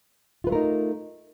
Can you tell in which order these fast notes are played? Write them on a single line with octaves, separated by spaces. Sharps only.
F4 B4 A3 A#4 D#4